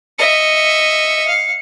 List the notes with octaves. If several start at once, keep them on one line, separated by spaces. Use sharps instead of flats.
D#5 E5 C#7
F5